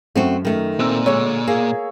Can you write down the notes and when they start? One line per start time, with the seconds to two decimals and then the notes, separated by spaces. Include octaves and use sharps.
0.15 F#2 A3 C4 F#4
0.45 D#3 A3
0.79 A#2 C4 E6
1.06 D3 G#3 C#5
1.47 A#3 G#4